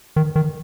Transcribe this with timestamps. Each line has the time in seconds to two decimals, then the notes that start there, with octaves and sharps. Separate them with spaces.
0.16 D#3
0.36 D#3